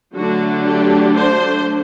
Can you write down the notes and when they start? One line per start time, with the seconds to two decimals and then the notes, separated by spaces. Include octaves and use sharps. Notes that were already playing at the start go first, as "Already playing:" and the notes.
0.14 D3 F#3 A3 D4 F#4
0.65 G4
1.16 C5